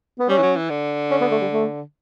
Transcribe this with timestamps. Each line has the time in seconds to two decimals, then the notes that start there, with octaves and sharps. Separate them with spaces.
0.19 B3
0.29 G3 C#4
0.38 E3
0.42 F#3
0.56 E3
0.70 D3
1.11 C#4
1.21 B3
1.31 A3
1.42 G3
1.52 A3